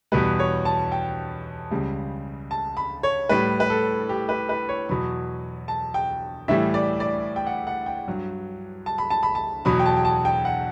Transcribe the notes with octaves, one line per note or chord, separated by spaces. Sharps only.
E2 B2 G3 B4
C#5
A5
G5
C#2 C#3 G3
A5
B5
C#5
A2 G3 B4
B4
A4
G4
B4
B4
C#5
E2 B2 F#3 B5
A5
G5
A2 E3 G3 E5
D5
D5
G5
F#5
F#5
G5
G2 F#3
A5
B5
A5
B5
A5
E2 B2 F#3 B5
G5
A5
G5
A5
G5
F#5